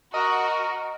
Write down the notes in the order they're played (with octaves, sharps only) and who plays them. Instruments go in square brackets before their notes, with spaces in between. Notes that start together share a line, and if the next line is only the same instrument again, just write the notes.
[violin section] F#4 [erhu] A#4 [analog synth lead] D#5